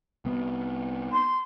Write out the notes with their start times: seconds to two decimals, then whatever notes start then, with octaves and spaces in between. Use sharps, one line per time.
0.25 C2 B3
1.12 C6